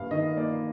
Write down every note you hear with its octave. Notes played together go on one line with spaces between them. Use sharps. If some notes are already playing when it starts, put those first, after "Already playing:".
Already playing: G1 G2 A#3 F5
D#3 D#5
A#3 D5